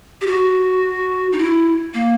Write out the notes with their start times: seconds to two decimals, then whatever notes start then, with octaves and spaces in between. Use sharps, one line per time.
0.21 G4
0.27 F#4
1.32 D#4
1.39 E4
1.94 A#3